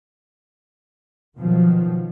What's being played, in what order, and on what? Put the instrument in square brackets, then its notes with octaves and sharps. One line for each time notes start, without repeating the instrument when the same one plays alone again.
[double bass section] B2 D#3 F3 F#3